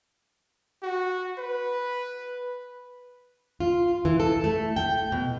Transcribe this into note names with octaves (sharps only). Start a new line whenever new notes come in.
F#4
B4
F4
E3
A4
A3
G5
B2